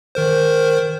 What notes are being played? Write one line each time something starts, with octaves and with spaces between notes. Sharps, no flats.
D#3 A#4 C5